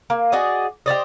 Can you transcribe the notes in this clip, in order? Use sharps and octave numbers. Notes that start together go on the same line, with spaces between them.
A#3
F#4 G#4 D5 D#5
G4 C5 D5 D#5